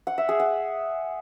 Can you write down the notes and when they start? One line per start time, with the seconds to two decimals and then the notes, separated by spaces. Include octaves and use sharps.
0.07 F#5
0.18 E5
0.29 G#4
0.40 F#5